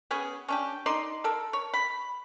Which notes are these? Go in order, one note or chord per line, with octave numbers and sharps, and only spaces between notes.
B3 C#4 G#4
C#4 D4 G4
D#4 D5 D#5 C6
A4 A#4
C#5
B5